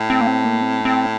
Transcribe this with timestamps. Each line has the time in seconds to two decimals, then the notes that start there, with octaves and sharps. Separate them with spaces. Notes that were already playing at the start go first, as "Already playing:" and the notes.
Already playing: A2
0.10 C4
0.21 A#3
0.27 C4
0.45 A#3
0.62 C4
0.85 C4